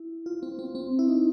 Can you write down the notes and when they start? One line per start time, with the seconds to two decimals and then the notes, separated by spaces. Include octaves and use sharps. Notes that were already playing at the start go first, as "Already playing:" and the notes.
Already playing: E4
0.26 F4
0.43 C4
0.59 C4
0.75 C4
0.99 E4
1.08 D#4